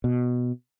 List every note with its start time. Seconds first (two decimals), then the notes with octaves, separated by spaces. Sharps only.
0.04 B2